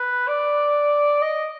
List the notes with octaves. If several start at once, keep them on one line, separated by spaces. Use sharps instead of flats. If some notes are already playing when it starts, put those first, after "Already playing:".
Already playing: B4
D5
D#5